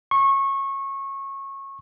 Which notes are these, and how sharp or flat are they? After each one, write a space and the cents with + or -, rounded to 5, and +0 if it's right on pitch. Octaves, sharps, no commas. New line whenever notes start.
C#6 -20